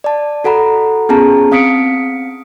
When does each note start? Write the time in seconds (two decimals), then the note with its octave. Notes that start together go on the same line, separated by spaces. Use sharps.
0.04 D5 A5
0.44 F#4 A4 F#5 A#5 B5
1.09 B3 C#4 F4 G#4 A5 A#5
1.51 C4 F5 D#6 B6 C#7 D7